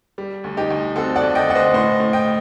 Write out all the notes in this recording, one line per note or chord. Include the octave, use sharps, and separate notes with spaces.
G3
D2
D#4 G4
D2
C4 F#4 A4
D5 F#5
D2
D#5 G5
D2 F#5
C5 D#5
A2 C5 D#5
A2
D#5 G5